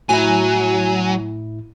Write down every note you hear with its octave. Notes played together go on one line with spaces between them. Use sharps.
A2 F#3 E4 G#5